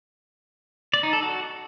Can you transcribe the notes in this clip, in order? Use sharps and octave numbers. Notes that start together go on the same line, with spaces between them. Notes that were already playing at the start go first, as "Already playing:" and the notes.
D5
D#4
A4
F#4